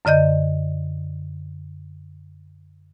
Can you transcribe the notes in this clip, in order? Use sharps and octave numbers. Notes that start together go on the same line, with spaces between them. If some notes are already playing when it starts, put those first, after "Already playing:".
F#2 D3 D5 D#5 G6